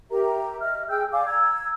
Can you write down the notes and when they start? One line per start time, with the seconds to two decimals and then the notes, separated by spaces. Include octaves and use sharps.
0.10 G4 A#4 E5 A#5
0.61 D#5 E5 F6
0.89 G#4 G5 E6 G6
1.11 D5 F5 G#5 D6
1.27 A#5 E6 G#6